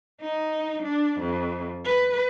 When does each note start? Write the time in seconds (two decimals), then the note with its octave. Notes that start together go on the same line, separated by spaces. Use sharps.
0.21 D#4
0.82 D4
1.19 F2
1.86 B4